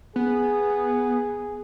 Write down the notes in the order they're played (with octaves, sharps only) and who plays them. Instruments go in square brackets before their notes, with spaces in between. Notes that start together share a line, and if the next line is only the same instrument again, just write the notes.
[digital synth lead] B3 [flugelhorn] G#4